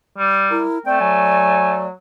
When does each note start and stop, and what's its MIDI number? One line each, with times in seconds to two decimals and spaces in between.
0.18 0.63 55
0.51 0.78 64
0.51 0.79 70
0.86 1.87 57
0.86 0.97 60
0.86 1.86 74
0.86 0.98 79
1.00 1.91 54
1.00 1.84 80